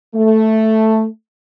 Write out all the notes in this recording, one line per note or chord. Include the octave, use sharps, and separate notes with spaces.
A3